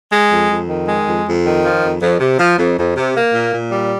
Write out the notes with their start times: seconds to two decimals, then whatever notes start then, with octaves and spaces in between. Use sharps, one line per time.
0.12 G#3
0.31 F2
0.50 F2
0.69 D#3
0.88 G#3
1.07 F2
1.27 F2
1.45 D#3
1.64 F3
1.83 F2
2.02 F2
2.20 C3
2.39 F3
2.58 F2
2.78 F2
2.97 C3
3.16 A#3
3.34 A#2
3.53 A#2
3.72 G3